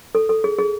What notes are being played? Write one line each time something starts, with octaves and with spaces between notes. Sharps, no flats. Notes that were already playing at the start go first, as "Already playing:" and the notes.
A4
A4
G#4
G#4